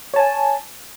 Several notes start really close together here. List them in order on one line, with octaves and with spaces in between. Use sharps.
C#5 A5 G#5